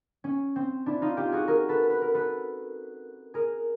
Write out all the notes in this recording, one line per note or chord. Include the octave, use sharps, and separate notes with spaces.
C#4
C4
D4 E4
D#4 F4
F4 G4
F#4 G#4
G#4 A#4
A4 B4
B4
A#4
A4 B4
G#4 A#4